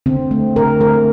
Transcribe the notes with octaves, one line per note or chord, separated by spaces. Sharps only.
D3 C4
A3
D3 A#4
A3 A#4